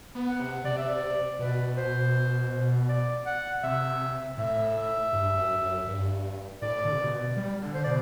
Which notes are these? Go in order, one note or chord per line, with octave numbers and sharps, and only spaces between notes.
B3
F#5
C3
C3 D5
E5
D5
B2 B4
C5
D5
F#5
C3 E5
A2 E5
G2
F#2
F#2
G2
A2 D5
D3
C3
B2
G3
D3
C5
B2 D5